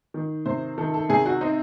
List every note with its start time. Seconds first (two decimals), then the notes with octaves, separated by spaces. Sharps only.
0.14 D#3
0.46 C3 C5
0.78 D#3 A4
0.94 A4
1.09 C3 G#4
1.26 F#4
1.41 C4 D#4